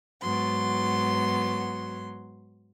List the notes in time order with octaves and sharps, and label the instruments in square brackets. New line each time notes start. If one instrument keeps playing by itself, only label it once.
[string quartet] G#2 F#3 B3 C6